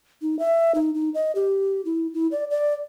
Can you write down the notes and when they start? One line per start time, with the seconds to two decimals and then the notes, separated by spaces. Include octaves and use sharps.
0.22 D#4
0.39 E5
0.75 D#4
0.95 D#4
1.14 D#5
1.35 G4
1.85 E4
2.14 E4
2.32 D5
2.51 D5